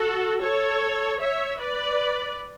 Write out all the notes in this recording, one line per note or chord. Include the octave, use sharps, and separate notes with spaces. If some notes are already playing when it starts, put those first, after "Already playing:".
Already playing: F#4 A4
A4 C#5
C#5 E5
B4 D5